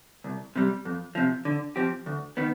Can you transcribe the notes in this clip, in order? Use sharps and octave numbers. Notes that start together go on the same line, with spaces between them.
C2
C3 G3
F2
C3 F3
D3
F3 C4 G4
D2
D#3 B3